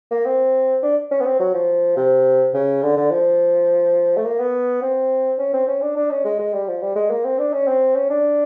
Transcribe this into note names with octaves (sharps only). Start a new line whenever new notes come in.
A#3
C4
D4
C#4
B3
C4
F#3
F3
C3
C#3
D3
D3
F3
A3
A#3
B3
C4
C#4
C4
C#4
D4
D4
C#4
G#3
G#3
G3
F3
G3
G#3
A#3
C4
D4
C#4
C4
C#4
D4